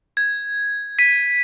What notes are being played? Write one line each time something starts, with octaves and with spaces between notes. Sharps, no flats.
G#6
B6 D#7